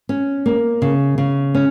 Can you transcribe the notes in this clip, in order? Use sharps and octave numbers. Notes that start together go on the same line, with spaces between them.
C#4
A#3
C#3
C#3
C#4